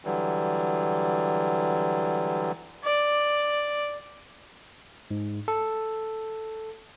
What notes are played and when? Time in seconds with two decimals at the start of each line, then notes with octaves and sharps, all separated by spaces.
0.05 D3 E3 F#3 G3
2.84 D5
5.11 G#2
5.48 A4